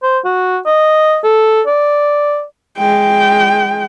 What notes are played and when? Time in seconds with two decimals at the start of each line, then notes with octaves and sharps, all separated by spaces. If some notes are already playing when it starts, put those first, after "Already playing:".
0.03 C5
0.24 F#4
0.66 D#5
1.24 A4
1.67 D5
2.77 G#3 G5